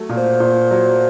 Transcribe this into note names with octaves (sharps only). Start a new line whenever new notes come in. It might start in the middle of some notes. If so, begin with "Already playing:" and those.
Already playing: F#3 A3
A#2
C5
A#2
F#3